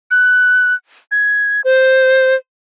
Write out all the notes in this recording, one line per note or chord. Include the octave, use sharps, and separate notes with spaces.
F#6
G#6
C5